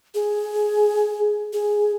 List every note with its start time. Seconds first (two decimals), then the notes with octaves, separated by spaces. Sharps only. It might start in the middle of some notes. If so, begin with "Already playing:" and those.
0.14 G#4
1.53 G#4